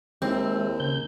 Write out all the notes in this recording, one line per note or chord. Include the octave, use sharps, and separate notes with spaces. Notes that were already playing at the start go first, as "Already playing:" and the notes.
D#2 G#3 C4 E4
C#3 G6